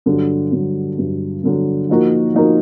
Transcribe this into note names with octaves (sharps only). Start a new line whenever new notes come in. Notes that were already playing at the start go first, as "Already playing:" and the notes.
G2 D3 F#3
G2 D3 F#3
G2 D3 F#3
G2 D3 F#3
F3 A#3 D#4 F#4 A#4
F3 A#3 D#4 F#4 A#4